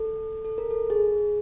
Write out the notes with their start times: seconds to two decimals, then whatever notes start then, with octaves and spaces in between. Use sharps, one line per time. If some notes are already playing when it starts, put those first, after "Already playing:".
Already playing: A4
0.45 A4
0.58 A#4
0.71 A4
0.90 G#4